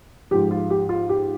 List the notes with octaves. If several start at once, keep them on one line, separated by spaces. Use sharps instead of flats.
G#2 F3 G4
F4
G4
F4
G4